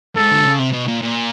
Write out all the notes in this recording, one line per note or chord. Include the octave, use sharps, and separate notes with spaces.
G#2 A4
D3
C#3
C3
B2
A#2
A#2